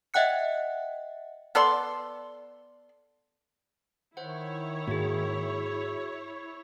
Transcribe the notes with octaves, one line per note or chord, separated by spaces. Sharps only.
D#5 E5 F#5 G5 F#6 C#7
B3 A4 D5 C6
D#3 E4 C5 C#5 F#5
G#2 A#3 F#4 G#4